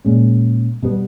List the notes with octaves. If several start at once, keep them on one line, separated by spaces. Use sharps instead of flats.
A#2 G#3 C#4
B2 G3 B3